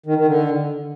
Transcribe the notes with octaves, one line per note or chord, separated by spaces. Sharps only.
D#3
D#3
D3